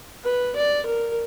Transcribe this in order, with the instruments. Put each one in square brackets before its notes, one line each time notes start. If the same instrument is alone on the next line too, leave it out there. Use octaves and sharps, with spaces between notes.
[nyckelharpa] B4
D5
A#4